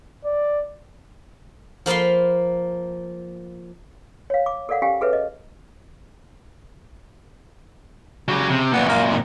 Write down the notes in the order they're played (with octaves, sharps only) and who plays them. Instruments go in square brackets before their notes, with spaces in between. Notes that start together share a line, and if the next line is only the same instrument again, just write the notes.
[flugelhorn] D5
[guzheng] F3 A#3 F5 B5 C6
[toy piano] C#5 F5
D6
A4 A#4 D5 F5 F#5
C#4 G4 F5 G#5
G#4 A4 B4 C#5 E5
D#5
[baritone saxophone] C#3 [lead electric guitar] F#3 G4
[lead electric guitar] C3
[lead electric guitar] F#2 A#2 [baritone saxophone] B3
[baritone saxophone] A#3
D#3